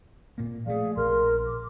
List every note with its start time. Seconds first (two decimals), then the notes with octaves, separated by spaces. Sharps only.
0.38 A#2 A#3
0.66 F3 G3 A3 G#4 D5 F5
0.97 A#1 A#4 C6 F6
1.46 D6